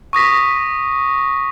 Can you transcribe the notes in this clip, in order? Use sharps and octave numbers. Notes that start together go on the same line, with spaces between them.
C#6 D#6 A#6 B6